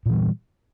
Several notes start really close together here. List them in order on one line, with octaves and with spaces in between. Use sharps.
A#2 E3 G3